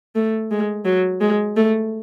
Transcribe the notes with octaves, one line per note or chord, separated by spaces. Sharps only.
A3
G#3
F#3
G#3
A3